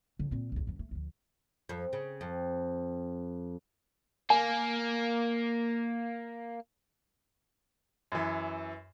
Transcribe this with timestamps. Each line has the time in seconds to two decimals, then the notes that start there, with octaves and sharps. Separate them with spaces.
0.19 D3 F3
0.31 A#2 C4
0.52 A#1 D#2
0.67 F#2 F3
0.79 A3
0.91 D2 F3
1.69 F2
1.93 C#3
2.21 F2
4.30 A#3 G#5
8.12 F#2 E3